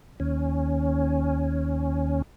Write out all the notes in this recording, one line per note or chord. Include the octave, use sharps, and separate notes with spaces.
D#2 C#4